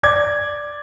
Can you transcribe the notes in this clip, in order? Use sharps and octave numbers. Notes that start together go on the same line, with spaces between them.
D5 D6 G#6